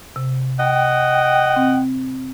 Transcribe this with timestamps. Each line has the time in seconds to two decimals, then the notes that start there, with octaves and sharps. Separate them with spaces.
0.16 C3
0.60 D#5 F#5 G5
1.56 C4